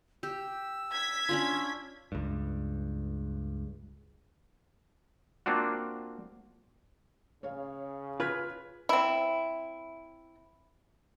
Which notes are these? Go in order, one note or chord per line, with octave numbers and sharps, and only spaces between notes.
G4 E6
G#6 B6
C#4 D4 F4
C#2 G2
A#3 C4 D4 F4 F#4
C#3 C#5 F5
F4 B4 F6 G#6 B6
C4 E4